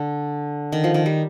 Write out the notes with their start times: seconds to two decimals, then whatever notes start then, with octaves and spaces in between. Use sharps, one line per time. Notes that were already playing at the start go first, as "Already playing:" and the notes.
Already playing: D3
0.72 D#3
0.84 F3
0.94 D#3
1.06 G3